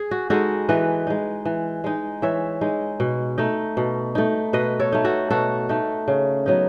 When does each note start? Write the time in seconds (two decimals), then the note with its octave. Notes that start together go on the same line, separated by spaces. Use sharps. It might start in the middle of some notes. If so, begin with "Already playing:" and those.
Already playing: G#4
0.11 F#4
0.30 G#3 D#4 F#4 A4
0.69 E3 B4 D#5
1.07 G#3 D#4
1.45 E3
1.84 G#3 D#4
2.22 E3 C#5 E5
2.61 G#3 D#4
3.00 B2
3.38 A3 D#4
3.77 B2
4.15 A3 D#4
4.53 B2 B4 D#5
4.79 A4 C#5
4.93 A3 D#4
5.05 F#4 A4
5.31 B2 F#4 A4
5.69 A3 D#4
6.08 C#3
6.46 F#3 B3 D#4